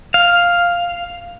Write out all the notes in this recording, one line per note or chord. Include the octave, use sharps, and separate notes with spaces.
F5